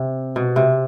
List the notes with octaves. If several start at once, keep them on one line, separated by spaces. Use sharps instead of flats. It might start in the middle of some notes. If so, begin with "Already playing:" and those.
Already playing: C3
B2
C3